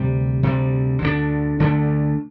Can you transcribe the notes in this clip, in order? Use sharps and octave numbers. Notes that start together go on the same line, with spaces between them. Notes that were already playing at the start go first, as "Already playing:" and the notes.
Already playing: D2 C3 G3
D2 C3 G3
D2 D3 A3 D4
D2 D3 A3 D4